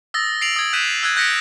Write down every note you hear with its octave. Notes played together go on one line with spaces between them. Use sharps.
D#6 E6 A6 A#6
C7 D7 F7 F#7
D#6 G#6
F#6 G6 B6 D#7 E7 F#7
E6 F#6 G#6 D#7
F#6 G6 A#6 B6 C#7 D7